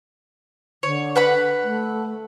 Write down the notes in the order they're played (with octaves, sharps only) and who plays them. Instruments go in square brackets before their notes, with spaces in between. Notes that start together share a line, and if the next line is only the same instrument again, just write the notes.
[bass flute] D3 [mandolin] C#5
[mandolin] B4 F#5 B5
[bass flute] A3